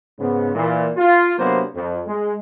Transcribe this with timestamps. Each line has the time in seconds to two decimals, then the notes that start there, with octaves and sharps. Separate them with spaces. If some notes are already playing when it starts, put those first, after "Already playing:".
0.19 G#2 C#3 B3
0.55 A#2 E3
0.97 F4
1.38 C3 F#3 A#3 B3 D4 C5
1.75 F2
2.07 G#3